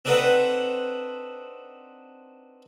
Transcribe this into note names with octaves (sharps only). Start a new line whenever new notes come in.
C4 D4 D#4 A4 B4 F#5